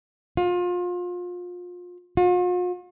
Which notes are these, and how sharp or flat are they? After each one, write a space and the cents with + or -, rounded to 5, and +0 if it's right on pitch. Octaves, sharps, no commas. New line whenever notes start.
F4 +30
F4 +45